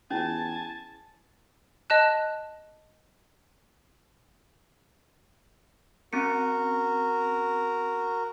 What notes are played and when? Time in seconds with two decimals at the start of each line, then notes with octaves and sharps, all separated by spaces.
0.11 E2 C#4 E4 G#5 A5
1.90 D#5 A5 F#6
6.13 C4 C#4 F#4 A#4 C#7